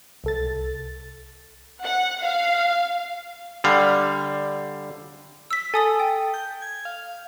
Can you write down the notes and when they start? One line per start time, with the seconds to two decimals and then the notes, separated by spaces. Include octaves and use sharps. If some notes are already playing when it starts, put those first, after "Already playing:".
0.24 C2 A4 A6
1.83 F#5
2.23 F5
3.64 D3 G3 F5
5.51 E6 B6
5.74 A4 G#5 D#6 A6
6.00 G5
6.34 G6
6.62 G#6
6.85 F5